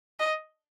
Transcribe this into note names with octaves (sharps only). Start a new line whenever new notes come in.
D#5